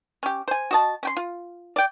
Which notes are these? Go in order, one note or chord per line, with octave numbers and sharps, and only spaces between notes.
C#4 G4
C5 G#5
F#4 D#5 A5
C#4 G5 C6
F4
D5 G5